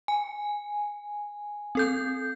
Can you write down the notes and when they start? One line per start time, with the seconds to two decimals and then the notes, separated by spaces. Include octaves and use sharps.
0.08 G#5
1.75 C4 A4 G6